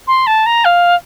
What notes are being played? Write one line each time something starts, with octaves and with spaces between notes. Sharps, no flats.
C6
A5
A#5
F5